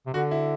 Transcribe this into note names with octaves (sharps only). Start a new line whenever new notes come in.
C3
D3 F#4
E4